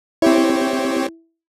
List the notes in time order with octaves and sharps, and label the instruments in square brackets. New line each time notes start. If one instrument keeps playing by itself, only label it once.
[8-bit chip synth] C4 G4 C#5 [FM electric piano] E4